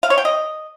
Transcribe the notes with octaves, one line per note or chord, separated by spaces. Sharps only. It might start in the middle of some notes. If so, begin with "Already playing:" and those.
F5
C#5
G5
D#5